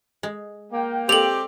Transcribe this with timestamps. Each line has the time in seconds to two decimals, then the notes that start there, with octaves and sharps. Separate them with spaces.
0.23 G#3
0.72 A#3 G5
1.09 G#3 C4 G4 A4 D5 F7 F#7